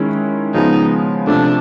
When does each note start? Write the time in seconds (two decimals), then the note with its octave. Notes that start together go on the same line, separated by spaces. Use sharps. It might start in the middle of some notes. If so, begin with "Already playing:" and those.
Already playing: D#3 G#3 C#4 E4
0.54 C#3 F3 G#3 B3 D#4
1.27 C3 F3 A3 D4